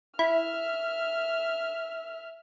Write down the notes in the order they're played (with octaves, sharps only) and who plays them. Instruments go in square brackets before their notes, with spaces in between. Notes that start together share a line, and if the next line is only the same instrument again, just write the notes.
[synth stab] E4 [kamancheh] E5 F6